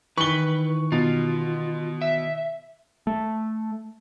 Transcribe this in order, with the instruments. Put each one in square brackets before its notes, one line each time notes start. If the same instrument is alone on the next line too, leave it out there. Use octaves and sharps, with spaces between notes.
[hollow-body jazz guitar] D#3 E3 [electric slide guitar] B4 [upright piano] C#6 G7
[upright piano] B2 [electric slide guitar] F4
[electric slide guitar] E5
[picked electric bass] A3